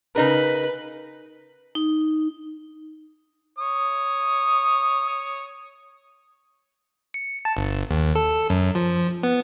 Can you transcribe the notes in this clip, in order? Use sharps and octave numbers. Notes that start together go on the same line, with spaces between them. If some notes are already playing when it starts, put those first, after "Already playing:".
C#3 D#4 A#4 B4
D#4
C#5 D#6
C#7
A5
G1
D#2
A4
F#2
F3
B3